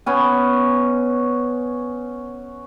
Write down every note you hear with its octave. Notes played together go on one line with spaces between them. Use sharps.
B3 C#4 G#5